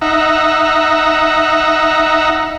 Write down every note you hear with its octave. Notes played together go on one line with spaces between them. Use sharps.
D#4 E5 F#5 A#5